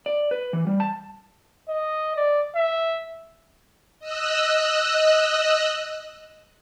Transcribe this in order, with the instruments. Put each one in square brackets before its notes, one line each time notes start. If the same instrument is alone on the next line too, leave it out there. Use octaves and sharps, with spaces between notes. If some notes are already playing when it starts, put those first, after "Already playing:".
[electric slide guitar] D5
B4
E3
G3
A5
[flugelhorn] D#5
D5
E5
[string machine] D#5 E6 F#6